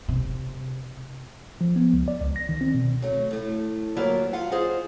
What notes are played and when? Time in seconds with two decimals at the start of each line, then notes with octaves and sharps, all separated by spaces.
0.08 C3
1.61 F3
1.76 B3
1.93 C#2
2.08 D5
2.21 C#2
2.36 A#6
2.49 D#3
2.61 C4
2.75 B2
3.02 F#3 A3
3.31 A2 A3
3.97 D2 F#3 A#3 E4 F4 D5
4.33 F4 F5 F#5
4.51 F4 G#4 C5 D#5